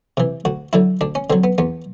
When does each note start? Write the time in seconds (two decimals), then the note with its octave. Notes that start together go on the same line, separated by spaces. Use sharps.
0.17 C3 E3
0.45 D2 F#4
0.73 D3 F#3 E4
1.01 D2 D4
1.15 C#4
1.30 D3 F#3 C4
1.44 B3
1.58 E2 B3